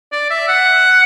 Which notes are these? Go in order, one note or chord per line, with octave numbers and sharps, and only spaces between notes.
D5
E5
F#5